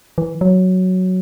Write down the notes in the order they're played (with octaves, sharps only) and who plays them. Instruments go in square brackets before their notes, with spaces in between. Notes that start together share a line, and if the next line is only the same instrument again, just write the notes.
[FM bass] E3
F#3